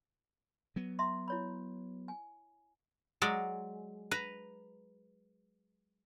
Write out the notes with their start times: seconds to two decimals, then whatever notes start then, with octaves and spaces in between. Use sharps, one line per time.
0.76 F#3 B3
0.99 E5 A#5 C6
1.28 E4 C#5 B5
2.08 G#5
3.22 F#3 G#3 D5
4.11 B4 A#5